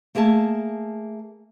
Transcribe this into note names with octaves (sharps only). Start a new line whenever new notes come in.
A3 A#3 G#4 E5 A5